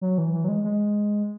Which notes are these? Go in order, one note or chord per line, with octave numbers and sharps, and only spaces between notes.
F#3
E3
E3
F#3
G#3
G#3